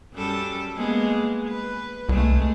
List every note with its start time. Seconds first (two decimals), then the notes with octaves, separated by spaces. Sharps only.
0.14 F#2 G3 A4
0.77 G#3 A#3 B3
1.48 B4
2.09 C2 G#3 A3